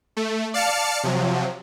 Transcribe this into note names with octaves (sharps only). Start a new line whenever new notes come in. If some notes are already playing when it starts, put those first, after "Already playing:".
A3
D5 F5 A5 F6 C#7
C3 F3 F#3